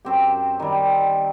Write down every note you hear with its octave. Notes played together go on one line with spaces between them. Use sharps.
F#2 C4 G4
D#3 G3